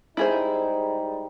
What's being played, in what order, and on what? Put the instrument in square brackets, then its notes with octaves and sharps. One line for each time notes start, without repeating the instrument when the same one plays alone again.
[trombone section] G#2 G3 D#4 [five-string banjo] E4 G#4 C5